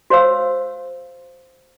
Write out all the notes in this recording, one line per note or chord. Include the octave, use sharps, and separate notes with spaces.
F#4 C5 C#5 F5 E6